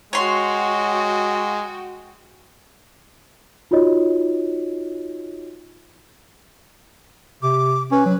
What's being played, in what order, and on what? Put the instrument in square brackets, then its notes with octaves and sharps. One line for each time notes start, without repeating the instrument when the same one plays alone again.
[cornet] G#3 [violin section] F#4 G5 [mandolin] C#5 C6
[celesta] D#4 F4 F#4 C#5 D#5
[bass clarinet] C3 [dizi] D6
[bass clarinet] C#4 [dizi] B4
[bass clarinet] F#3